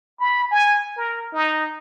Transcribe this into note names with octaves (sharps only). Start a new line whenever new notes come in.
B5
G#5
A#4
D#4